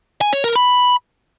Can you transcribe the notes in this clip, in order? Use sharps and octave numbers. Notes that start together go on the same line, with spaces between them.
G#5
C#5
A#4
B5